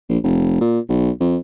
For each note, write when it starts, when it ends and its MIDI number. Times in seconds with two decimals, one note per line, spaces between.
0.09 0.18 34
0.24 0.60 29
0.61 0.79 46
0.89 1.11 35
1.20 1.37 41